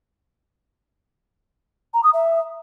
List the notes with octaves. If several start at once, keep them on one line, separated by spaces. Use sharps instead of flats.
A#5
D#6
E5